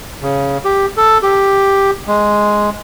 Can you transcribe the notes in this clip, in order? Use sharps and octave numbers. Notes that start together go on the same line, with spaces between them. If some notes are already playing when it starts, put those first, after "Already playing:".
C#3
G4
A4
G4
G#3